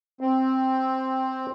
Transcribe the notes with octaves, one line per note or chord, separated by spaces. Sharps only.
C4